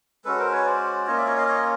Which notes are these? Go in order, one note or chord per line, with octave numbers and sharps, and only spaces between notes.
G#3 C#4 F#4 A4 B4
A#4 C5
B4 C#5
C5 D5
A#3 C#4 F4 C#5 D#5
D5 E5
C#5 D#5
D#5 F5
C#5 D#5